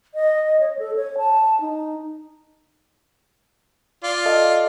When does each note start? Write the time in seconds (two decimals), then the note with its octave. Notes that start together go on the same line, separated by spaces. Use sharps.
0.15 D#5
0.60 C#5
0.79 A4
0.96 C#5
1.18 A5
1.61 D#4
4.04 F4 D5
4.26 A4 D#5 F5